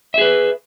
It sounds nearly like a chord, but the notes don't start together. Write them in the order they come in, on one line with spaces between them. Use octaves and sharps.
E5 G#4 B4